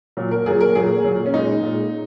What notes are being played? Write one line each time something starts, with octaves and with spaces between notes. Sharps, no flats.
A#2 F#3
A#4
A#2 F#3 G#4
A#4
A#2 F#3 G#4
A#2 F#3
C#4
A#2 G#3 D#4
A#2 G#3